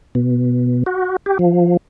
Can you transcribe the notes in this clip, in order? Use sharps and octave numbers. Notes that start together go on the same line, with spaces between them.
B2
F#4
G4
F3